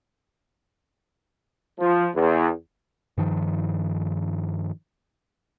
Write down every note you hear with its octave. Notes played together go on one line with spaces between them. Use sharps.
F3
E2
G2 D#3 F3